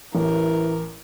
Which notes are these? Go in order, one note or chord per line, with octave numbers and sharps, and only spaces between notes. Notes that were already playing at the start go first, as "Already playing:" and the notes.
A1 E3 A#4